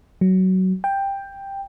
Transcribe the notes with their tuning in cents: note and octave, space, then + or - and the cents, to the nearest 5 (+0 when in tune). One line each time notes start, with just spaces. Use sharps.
F#3 +15
G5 +10